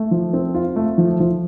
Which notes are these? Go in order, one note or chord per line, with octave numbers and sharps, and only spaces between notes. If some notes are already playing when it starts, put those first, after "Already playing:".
Already playing: A3
F3
C4
F4
A3
F3
F3